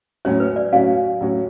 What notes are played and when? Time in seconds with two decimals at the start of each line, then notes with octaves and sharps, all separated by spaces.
0.25 A2 F#3 C#4 F#4 C#5
0.40 B4
0.56 D5
0.73 A2 F#3 C#4 F#4 F5
1.21 A2 F#3 C#4 F#4